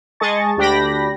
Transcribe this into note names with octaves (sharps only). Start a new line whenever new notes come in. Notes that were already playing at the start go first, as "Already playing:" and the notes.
G#3 G#4 D#5 A5 C#6 A6
D2 D4 G4 G5 B5 A#6